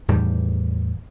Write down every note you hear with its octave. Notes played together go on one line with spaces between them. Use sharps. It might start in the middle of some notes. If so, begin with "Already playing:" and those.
E2 A2 D#3 G3